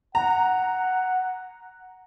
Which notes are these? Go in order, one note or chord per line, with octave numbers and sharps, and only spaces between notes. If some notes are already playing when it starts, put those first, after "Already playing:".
F#5 A#5